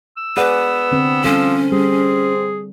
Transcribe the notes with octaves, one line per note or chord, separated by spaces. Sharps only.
E6
B3 G#4 B4 D5 F#5
D3 C4
F3 G3 C#4 A4 C5
G3 C4 G#4